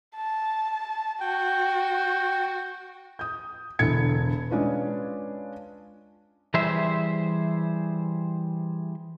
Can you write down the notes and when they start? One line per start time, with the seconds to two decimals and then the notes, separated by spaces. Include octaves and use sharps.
0.15 A5
1.20 F#4 G5
3.19 D#6 G6
3.79 E1 D3 E4 A4 G#6 C#7
4.50 G#3 C#4 D4 F4 B4
6.54 E3 G3 G#4 C5 E5